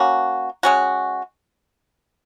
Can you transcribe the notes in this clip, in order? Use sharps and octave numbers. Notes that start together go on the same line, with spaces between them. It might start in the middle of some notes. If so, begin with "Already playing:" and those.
Already playing: A#3 C#4 F#4
G#3 C#4 F#4